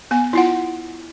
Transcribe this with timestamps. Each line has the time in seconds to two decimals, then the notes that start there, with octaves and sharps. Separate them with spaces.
0.11 B3 G#5
0.33 E4 F4 F#5